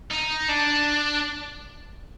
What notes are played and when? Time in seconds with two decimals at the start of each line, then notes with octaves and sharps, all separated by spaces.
0.11 D#4
0.49 D4